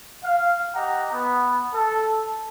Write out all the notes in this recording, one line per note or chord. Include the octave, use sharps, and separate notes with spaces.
F5
G4 D#5 F#5 A#5
B3
A4